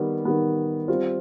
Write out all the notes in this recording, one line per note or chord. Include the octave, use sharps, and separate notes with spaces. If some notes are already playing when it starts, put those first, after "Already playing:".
Already playing: D#3 G3 B3
D#3 G3 B3
G3 C4 F4